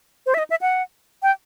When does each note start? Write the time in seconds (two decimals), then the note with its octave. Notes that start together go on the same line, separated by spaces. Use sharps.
0.26 C5
0.34 E5
0.38 D#5
0.50 E5
0.61 F#5
1.23 G5